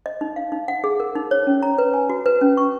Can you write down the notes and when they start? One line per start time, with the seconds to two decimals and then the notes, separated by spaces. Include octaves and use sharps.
0.06 D#5
0.21 D#4
0.36 F5
0.52 D#4
0.68 F#5
0.84 G#4
1.00 A#4
1.15 D#4
1.31 C#5
1.47 C#4
1.63 A#5
1.78 B4
1.94 G#5
2.10 F#4
2.26 B4
2.41 C#4
2.57 C#6